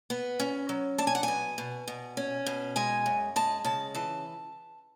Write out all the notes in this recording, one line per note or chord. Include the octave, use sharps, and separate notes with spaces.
B3
C#4
F#3
D4 A5
G#5
F#5
B2 G#5
B2
B2
C#4
B2
G#3 G#5
F#2
G#3 A5
C#3 A5
E3 A5